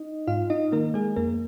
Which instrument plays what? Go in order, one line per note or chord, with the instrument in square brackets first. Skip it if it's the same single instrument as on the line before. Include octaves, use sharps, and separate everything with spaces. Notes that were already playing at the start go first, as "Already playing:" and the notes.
Already playing: [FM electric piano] D#4 D#5
G#2 F4 F5
D#4 D#5
D#3 A#3 A#4
G#3 G#4
F2 A#3 A#4